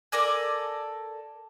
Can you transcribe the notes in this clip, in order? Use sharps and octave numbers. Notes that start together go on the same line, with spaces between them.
A4 A#4 D5 G#5